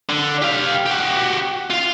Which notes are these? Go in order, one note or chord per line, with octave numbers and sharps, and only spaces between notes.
D3
G4 F5
F#4 G4
F4 F5